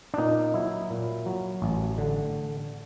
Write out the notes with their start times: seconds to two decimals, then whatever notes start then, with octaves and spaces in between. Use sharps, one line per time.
0.14 D4
0.18 A#2 D#4
0.54 F#3 E4
0.90 A#2
1.26 F#3
1.62 A1
1.98 D3